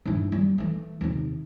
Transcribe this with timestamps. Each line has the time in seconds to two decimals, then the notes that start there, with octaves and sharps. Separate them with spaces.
0.06 G2 E4
0.32 G3
0.58 E3 A3
1.01 D#2 C3